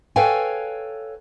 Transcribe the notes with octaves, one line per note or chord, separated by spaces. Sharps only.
A4 B4 C#5 F5 G5 G#5